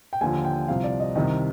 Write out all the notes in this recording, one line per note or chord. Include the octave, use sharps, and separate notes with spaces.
G5
D#2 D3 F3 G#5
G5
C2 C3 F3 F5
D5
D#5
C2 C3 D#3 D#5